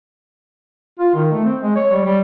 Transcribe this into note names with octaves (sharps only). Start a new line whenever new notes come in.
F4
D#3
A3
C4
G#3
C#5
G3
G3